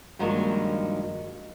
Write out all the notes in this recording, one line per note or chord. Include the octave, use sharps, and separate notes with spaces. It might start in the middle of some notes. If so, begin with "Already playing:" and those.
G2 D#3 F3 F#3 G#3 A#3